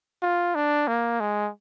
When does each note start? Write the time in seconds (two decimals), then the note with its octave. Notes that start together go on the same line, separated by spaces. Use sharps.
0.23 F4
0.55 D4
0.88 A#3
1.20 G#3